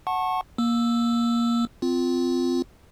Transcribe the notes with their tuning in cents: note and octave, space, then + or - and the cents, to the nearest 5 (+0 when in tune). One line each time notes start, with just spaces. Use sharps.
F#5 +0 A5 +0 C#6 -30
A#3 +15 E6 +0
C4 -25 F4 +0